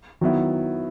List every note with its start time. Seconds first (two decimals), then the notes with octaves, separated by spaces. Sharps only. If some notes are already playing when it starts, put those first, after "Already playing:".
0.21 D#3 F#3 B3 E4